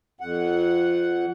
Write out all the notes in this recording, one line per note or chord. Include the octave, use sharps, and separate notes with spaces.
F2 F#5